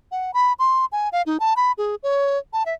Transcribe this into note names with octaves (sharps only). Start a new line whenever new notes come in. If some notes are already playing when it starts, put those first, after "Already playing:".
F#5
B5
C6
G#5
F5
D#4
A5
B5
G#4
C#5
A5
E5